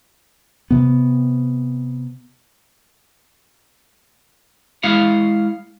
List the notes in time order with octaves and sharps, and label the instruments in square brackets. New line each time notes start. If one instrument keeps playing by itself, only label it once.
[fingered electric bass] C3 B3
[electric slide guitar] G#3 E4 F5 F#5